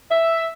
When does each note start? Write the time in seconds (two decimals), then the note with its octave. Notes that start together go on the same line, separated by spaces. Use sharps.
0.10 E5